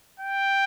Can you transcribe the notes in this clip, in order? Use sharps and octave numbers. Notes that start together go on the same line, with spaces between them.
G5